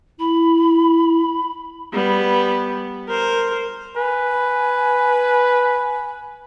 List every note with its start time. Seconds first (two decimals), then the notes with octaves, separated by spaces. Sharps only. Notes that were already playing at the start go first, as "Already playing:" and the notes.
0.19 E4 B5
1.93 G3 B3
3.08 A#4 C5
3.96 B4 G#5